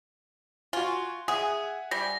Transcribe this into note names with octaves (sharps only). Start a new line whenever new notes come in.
F4 F#4 G#5
G#4 E5 F#5 G#5
G3 A#6